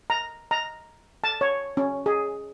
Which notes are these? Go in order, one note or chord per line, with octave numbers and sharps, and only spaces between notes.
A#5
A#5
A5
C#5
C#4
G#4